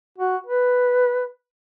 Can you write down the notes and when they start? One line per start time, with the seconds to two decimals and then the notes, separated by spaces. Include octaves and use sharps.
0.18 F#4
0.47 B4